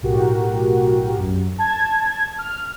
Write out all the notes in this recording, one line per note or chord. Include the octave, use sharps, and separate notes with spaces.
B1 A2 F#4 G4 A#4
F#2
A5 G#6
F6